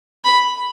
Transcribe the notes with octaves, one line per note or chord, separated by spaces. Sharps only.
B5